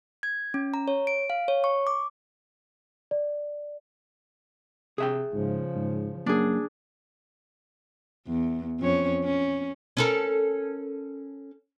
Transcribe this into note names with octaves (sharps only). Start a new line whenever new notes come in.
G#6
C#4
A#5
C#5
D7
F5
C#5
C#6
D6
D5
C3 G#4 E5 G5
G#2 C#3 F3
G#2
F#2 A#3 D4 G#4
E2
F2 C#4 C#5
C#4
C#4 A4 A#4